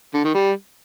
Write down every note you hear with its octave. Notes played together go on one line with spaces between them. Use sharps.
D3
D#3
G3